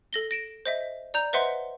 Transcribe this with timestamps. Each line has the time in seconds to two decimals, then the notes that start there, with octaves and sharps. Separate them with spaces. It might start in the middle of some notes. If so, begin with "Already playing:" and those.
0.13 A4 A#6 G7
0.31 A#6 D7 E7
0.65 C5 D#5 E5
1.14 D5 A#5 G6 F7
1.33 B4 C5 D#5 E5 F#5 C6